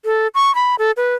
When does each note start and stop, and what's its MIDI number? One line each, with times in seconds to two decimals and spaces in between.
0.05 0.28 69
0.35 0.54 85
0.55 0.76 83
0.79 0.91 69
0.97 1.15 71